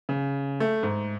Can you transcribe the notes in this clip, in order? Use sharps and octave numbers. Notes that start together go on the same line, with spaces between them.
C#3
A3
G#2